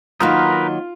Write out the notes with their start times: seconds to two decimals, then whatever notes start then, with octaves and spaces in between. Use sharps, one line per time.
0.20 D#3 F#3 A#3 D#4 F4 A#4 B4